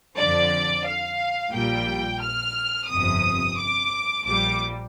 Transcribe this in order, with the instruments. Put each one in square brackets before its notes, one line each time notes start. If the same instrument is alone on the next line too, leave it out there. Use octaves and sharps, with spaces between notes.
[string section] F2 D3 F3 D5
F5
A#1 A#2 G3 G5
F6
G1 F2 C3 D#6
D6
A#1 A#2 G3 D6